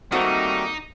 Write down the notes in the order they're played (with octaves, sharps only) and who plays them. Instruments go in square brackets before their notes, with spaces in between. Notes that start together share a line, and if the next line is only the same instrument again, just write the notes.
[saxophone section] D#3 A3 A#3 [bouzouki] G3 C4 F#4 [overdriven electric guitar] D#4